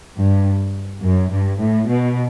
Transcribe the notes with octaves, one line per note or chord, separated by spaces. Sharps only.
G2
F#2
G2
A2
B2